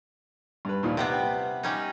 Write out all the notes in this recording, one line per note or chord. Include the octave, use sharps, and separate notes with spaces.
G2 B4
D#2 A#2 F3
C3 G3 B3 B4
G3 C#4 D#4